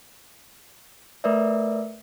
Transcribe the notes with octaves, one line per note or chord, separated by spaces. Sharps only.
A3 A#4 B4 D5 E5